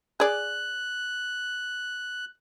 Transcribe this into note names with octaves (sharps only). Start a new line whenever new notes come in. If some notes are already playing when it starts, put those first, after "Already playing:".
G#4 D5 F#6